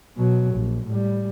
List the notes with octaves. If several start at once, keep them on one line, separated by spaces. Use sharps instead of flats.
B2 F#3
A#1
A2 G3